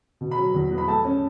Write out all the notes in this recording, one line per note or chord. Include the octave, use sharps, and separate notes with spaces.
B2
B5
F#3
E2
B3
B5
A3 A5
C#4